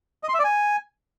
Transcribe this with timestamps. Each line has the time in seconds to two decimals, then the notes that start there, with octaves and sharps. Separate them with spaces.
0.23 D#5
0.29 C6
0.34 E5
0.39 D5
0.44 G#5